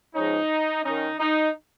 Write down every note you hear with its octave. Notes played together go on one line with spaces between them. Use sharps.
G#2 F3 G#3 C#4 D#4
D#3 C#4 D#4
D#4